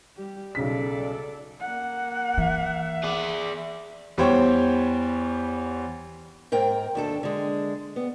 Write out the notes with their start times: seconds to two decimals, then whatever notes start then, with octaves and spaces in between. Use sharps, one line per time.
0.17 G3 G4
0.55 B1 C#3 A4 D5 B6
1.60 A#3 F#5
2.37 E3 E5
3.04 G#4 D5
4.18 E2 G3 C5 C#5 G5 C#6
6.52 G#2 A#4 G5
6.95 D#2 D4 A4
7.23 D3 G#3
7.96 B3